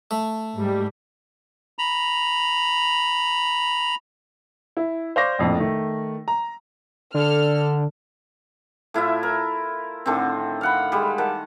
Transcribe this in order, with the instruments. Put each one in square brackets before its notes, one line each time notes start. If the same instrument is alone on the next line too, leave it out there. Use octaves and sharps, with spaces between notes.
[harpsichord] A3 E5
[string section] G#2 G3
[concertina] A#5 B5
[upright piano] E4
C5 D5 F5 C#6 D6 A#6
A#1 F2 A2
D#3 A3
A#5
[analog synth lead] D3 [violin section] A4 F6
[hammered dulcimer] A2 E4 F4 E5
A#4
A2 D3 D#3 C4
F5 F#5 B5
G3 G#3
D#3 F#5 A5